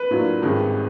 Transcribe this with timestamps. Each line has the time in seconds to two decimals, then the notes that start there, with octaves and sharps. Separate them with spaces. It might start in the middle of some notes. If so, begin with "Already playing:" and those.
Already playing: B4
0.11 A2 F#3 A#3 D4 F4
0.42 G#1 G2 D#3 G#3 C#4